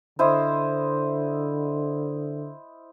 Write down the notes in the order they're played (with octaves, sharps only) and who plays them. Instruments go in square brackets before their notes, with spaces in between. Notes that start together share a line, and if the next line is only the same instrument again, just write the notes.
[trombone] D3 [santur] E4 C5 D#5